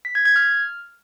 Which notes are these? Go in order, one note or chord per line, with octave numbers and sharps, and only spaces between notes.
B6
G#6
G#6
F6